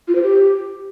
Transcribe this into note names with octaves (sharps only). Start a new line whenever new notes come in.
F4
C5
G4